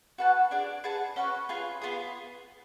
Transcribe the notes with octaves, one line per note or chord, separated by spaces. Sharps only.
F#4 B4 F#5 A5
D4 G#4 D5
G#4 B4 F#5 A5
C#4 F#4 B4
F4 G#4 B4
B3 F4 G#4